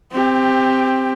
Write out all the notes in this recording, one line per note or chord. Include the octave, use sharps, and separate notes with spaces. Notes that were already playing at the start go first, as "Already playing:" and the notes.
C4 G4